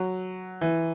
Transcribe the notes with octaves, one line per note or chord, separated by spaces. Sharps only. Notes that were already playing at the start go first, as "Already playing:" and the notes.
Already playing: F#3
E3